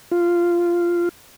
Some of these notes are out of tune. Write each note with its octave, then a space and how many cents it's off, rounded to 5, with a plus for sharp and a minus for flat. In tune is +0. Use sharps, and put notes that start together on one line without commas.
F4 -10